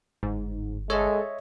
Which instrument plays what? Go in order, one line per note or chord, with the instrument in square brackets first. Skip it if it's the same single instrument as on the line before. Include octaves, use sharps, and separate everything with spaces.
[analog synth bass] G1 [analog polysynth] G#2
[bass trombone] G#3 [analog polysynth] A4 [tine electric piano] C#5 D#5 E5